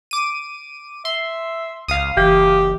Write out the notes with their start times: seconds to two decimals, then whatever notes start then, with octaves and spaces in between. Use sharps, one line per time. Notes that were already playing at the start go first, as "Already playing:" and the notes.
0.11 D6 D#7
1.05 E5 C6
1.88 C#2 F5 D#6
2.17 F#1 E3 G4